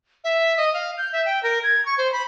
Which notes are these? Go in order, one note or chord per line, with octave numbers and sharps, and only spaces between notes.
E5
D#5
F5
G6
E5
G5
A#4
G#6
C#6
C5
B5